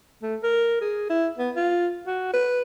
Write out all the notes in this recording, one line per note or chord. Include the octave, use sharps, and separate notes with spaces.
A3
A#4
G#4
E4
B3
F4
F#4
B4